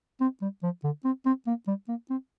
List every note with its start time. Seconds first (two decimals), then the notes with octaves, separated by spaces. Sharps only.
0.21 C4
0.42 G3
0.63 F3
0.84 D3
1.05 C4
1.26 C4
1.47 A#3
1.67 G3
1.89 A#3
2.10 C4